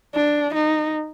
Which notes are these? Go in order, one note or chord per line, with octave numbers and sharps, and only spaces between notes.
D4
D#4